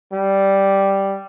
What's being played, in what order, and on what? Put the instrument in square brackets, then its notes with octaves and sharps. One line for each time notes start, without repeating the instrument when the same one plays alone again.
[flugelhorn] G3